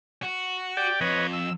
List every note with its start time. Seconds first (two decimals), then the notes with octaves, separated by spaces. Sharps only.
0.23 F#4
0.77 G4 D5 G5
1.01 F2 B4 C#5 D#5
1.33 E6